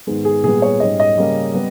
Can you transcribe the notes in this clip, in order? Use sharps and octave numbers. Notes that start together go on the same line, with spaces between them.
G#2 D#3 G#3 B3
G#4
A#2 G3 B3 G#4
C#5
G#2 G3 C#4 D#5
D#5
C#3 G3 A#3 C#4
G3 B3